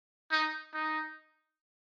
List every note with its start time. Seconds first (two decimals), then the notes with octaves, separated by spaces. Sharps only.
0.32 D#4
0.74 D#4